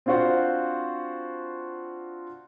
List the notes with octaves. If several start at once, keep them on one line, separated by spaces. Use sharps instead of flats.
C4 D4 F4 F#4 C5 F#5